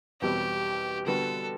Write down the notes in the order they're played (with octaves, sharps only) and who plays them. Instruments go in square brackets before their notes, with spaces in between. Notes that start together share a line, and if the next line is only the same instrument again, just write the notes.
[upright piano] E2 B2 G3 C4 [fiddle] G4
[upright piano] D3 G3 B3 F#4 [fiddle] A4